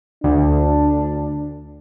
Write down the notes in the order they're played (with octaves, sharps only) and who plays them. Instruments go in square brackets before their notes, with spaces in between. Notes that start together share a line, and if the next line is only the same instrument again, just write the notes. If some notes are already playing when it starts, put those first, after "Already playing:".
[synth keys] D2 [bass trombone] D4